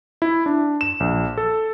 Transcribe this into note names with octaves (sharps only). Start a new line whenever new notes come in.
E4
D4
E7
A#1
A4